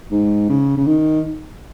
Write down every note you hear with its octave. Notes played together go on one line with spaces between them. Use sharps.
G#2
C#3
C#3
D#3